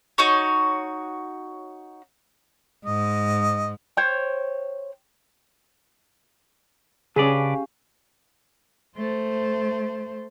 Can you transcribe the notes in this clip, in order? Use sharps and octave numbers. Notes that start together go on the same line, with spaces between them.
D#4 F#4 C#5
G#2 D#5
C5 C#5 G5
C#3 C#4 D4 G4 G#4 B4 D5 F5
A3 C5